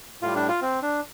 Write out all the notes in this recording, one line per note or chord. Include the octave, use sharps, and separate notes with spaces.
A2 G3 F4
D4
F4
C4
D4